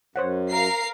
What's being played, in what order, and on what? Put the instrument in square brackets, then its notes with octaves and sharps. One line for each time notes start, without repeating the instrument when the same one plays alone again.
[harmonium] F#2 [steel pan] C5 C#5 F#5
[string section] A#4 [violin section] F5 A#5 C7